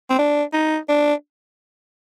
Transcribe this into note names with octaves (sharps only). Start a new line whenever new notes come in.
C4
D4
D#4
D4